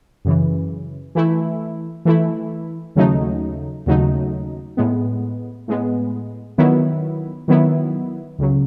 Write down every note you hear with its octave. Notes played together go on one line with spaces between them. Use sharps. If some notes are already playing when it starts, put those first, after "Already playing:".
F#2 C#3 E3
E3 A3 E4
E3 A3 E4
D#2 C#3 F#3 A3 D#4
D#2 C#3 F#3 A3 D#4
A2 G#3 B3
A2 G#3 B3
D#3 F#3 B3 E4
D#3 F#3 B3 E4
C#2 C#3 F#3